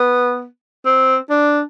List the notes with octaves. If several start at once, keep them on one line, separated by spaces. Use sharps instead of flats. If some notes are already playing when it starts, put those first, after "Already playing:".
Already playing: B3
C4
D4